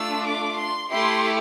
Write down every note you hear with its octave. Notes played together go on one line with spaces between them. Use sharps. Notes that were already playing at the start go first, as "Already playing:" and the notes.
Already playing: A3 D4 F4 E6
D6
C6
A3 E4 G4 C6